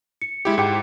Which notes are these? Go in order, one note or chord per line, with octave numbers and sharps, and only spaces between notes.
C#7
G#3 E4 G4
G#2 G4 G5 C#7